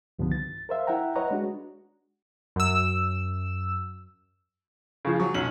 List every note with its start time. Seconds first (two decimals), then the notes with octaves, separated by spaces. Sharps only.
0.19 C2 G2 D3 D#3 F3 B3
0.32 A6
0.69 A#4 C5 E5 F5
0.87 E4 E5 F#5 G5 A#5
1.15 B4 C#5 D#5 F#5 A#5
1.31 G#3 D4 F#4
2.56 F#2 E6
5.05 C#3 F3
5.20 F#3 C#6
5.34 B1 C#4 F#7